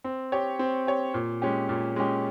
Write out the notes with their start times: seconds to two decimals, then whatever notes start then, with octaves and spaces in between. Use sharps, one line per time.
0.04 C4
0.32 G4 C#5
0.59 C4
0.87 G4 C#5
1.14 A#2
1.42 G#3 C#4 G4
1.69 A#2
1.96 G#3 C#4 G4